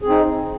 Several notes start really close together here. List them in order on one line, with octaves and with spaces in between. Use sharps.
G#4 C4 D#4